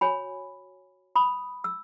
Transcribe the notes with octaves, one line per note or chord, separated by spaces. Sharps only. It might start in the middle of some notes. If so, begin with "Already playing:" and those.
F#4 C#5 G#5 B5
B5 D#6
E6